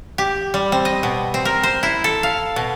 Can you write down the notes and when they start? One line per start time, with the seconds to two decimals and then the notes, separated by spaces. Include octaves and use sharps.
0.18 G4
0.54 G3
0.72 C4
0.85 D#5
1.03 B2
1.34 C4
1.45 A#4
1.63 C5
1.83 E4
2.04 A4
2.23 F5
2.56 B2